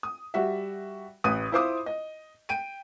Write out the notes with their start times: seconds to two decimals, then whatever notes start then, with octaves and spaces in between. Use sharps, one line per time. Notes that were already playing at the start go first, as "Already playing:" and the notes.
0.03 D#6
0.34 G3 F#4 E5
1.24 A1 B4 D#6 D#7
1.52 E4 F4 C5 C6 D6 D#6
1.86 D#5
2.49 G5 D7 D#7